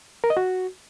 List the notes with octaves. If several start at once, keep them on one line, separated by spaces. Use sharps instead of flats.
A#4
D#5
F#4